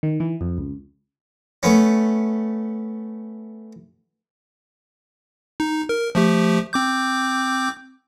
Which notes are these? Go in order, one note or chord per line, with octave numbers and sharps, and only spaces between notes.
D#3
E3
F2
C#2
A3 B3 C#4
D#4
A#4
F3 A3 G4
C4 D6 G6